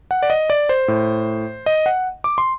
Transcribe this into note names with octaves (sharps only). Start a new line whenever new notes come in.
F#5
D5
D#5
D5
C5
A2
D#5
F#5
D6
C6